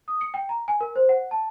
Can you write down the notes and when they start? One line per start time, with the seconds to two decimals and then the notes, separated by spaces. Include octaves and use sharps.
0.08 D#6
0.21 C#7
0.34 G5
0.49 A#5
0.68 G#5
0.81 A#4
0.96 C5
1.09 F#5
1.31 A5